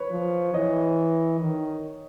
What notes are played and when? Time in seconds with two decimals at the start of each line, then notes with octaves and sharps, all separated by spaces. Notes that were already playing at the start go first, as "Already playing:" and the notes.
Already playing: B4 C#5
0.11 F3
0.54 E3 C#5 D#5
1.40 D#3